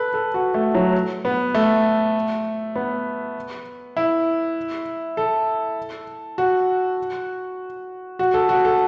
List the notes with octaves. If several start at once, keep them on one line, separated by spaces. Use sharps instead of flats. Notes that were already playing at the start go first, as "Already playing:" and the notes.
Already playing: A4 B4
A4
F#4
A3
F#3
B3
A3
B3
E4
A4
F#4
F#4
A4
F#4
A4